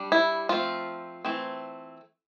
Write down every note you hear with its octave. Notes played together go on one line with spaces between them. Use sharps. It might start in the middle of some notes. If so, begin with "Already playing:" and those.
Already playing: G3 D4
E4
F3 A3 C4 F4
E3 A3 C4